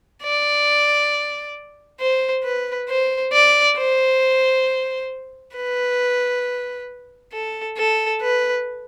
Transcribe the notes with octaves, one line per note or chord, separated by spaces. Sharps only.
D5
C5
B4
C5
D5
C5
B4
A4
A4
B4